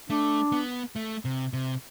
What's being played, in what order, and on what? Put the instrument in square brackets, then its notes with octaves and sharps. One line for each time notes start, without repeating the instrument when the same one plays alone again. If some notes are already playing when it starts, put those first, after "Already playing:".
[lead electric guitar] A3 [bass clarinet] D4
[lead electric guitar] B3
A3
C3
C3